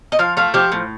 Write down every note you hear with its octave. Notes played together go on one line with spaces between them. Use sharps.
D#5
F3 F5
A3 F5
F3 G4
A2